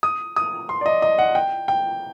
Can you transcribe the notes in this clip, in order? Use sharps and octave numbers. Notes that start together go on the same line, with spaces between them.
D#6
D#6
C6
D5
D#5
D#5
F#5
G5
G5